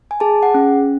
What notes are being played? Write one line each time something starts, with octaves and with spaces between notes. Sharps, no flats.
G#5
G#4 A5
F#5
C#4